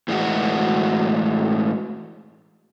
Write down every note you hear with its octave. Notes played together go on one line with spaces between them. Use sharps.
A2 E3 G#3 F#4